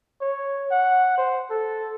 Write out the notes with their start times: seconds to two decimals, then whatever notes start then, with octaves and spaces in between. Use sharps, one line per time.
0.21 C#5
0.71 F#5
1.18 C5
1.51 A4